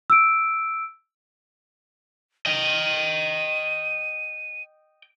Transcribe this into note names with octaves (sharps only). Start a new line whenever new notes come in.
E6 D7
D#5 G5 D#7